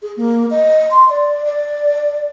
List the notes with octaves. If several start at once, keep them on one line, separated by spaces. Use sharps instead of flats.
G#4
A#3
D#5
C6
D5
D5